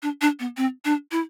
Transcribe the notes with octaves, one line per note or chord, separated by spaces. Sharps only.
D4
D4
B3
C4
D4
E4